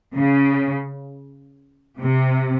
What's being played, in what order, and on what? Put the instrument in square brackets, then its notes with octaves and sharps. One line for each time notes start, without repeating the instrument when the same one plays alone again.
[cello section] C#3
C3